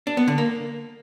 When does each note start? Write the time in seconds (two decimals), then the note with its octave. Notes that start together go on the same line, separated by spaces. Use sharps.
0.07 D4
0.17 B3
0.28 D3
0.38 A#3